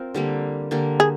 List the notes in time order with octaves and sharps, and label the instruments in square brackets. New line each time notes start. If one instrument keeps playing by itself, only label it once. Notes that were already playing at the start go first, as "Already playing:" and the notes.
Already playing: [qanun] C4 F4 A#4
D3 G3 A#3
D3 G3 A#3
[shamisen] G#4